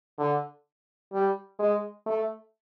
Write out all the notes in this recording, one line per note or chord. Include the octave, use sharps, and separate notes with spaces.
D3
G3
G#3
A3